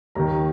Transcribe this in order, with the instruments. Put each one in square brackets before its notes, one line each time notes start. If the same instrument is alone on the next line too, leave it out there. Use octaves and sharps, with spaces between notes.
[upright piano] D#2 D#3 A#5